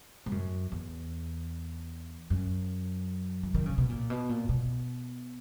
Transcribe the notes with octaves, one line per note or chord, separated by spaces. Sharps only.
G#2
F#2
E2
F#2
E3
D#3
C#3
B2
A#2
B2
A#2
B2